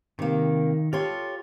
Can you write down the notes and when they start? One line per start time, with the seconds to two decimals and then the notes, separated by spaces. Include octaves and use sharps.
0.19 C3 D#3 A#3
0.93 F4 G4 A4 C#5 C6